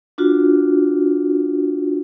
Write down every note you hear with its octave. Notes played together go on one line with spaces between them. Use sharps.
D4 F4 F#4